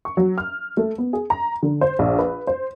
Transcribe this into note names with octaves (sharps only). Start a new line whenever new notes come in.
C#6
F#3
F6
A3
B3
G#4
A#5
D3
C5
A#1
B4
C5